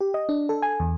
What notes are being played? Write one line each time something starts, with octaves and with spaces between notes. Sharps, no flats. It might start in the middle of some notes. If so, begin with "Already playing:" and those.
G4
D#5
D4
A4
G#5
E2